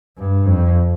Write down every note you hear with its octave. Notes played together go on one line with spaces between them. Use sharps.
G2
F2